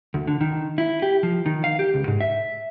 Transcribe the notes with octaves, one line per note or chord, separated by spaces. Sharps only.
D2
D3
D#3
E4
G4
F3
D#3
F5
G4
C#2
G#2
E5